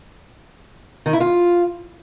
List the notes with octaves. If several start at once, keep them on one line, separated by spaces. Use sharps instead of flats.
D#3
E4
F4